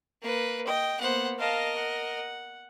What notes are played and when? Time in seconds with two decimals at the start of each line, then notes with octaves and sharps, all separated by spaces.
0.23 A#3 B4
0.67 D#5 G5
1.01 A#3 B3 C5 F#5
1.40 A#4 D#5 F5 A5
1.76 F#5